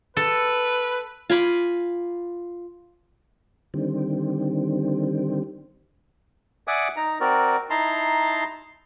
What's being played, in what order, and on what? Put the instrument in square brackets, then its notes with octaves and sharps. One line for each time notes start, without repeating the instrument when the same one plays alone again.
[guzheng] A4 [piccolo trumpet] B4
[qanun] F4 G#5 B5 D6
[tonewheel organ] D3 D#3 G3 C4
[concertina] D5 E5 F#5 G#5 D6 D#6
D#4 A#5
C4 F#4 A#4 D5
D#4 E4 A5 A#5 C6